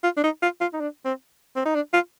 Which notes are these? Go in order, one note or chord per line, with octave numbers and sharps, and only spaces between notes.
F4
D4
D#4
F4
F4
D#4
D4
C4
C4
D#4
D4
F4